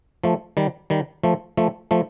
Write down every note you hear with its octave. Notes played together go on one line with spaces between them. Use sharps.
F3 A3
D#3 G3
D#3 G3
F3 A3
F3 A3
F3 A3